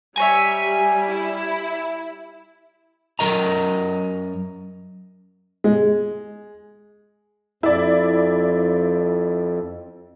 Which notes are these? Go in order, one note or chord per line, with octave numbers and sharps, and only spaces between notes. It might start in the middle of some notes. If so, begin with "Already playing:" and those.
G3 D#4 C#5 E5 G#5
E4
F#2 G3 A#4 D#5 A#5
G#3
F2 E4 D5